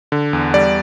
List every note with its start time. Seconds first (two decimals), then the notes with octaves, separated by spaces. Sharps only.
0.12 D3
0.33 E2
0.54 G3 D5